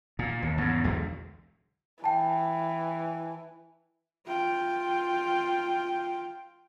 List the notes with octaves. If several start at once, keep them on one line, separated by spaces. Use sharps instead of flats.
A#2
D#2
E2 G#2 C#3
B1 E2 D3 G#3
E3 G5 A5
F4 G5